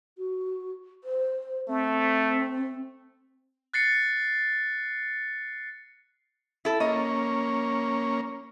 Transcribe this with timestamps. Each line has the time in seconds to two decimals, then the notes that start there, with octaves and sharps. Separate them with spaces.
0.18 F#4
1.04 C5
1.68 A3 C4
3.74 F#6 A6 C7 C#7
6.65 E4 A4
6.80 A#3 C#4 D#5